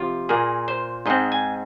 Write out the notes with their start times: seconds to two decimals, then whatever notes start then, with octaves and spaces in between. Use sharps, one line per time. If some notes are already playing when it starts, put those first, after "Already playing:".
Already playing: C3 F3 F4
0.29 A#2 A#3 G#4
0.68 C5
1.06 G#2 G#3 C4 D#5
1.32 G#5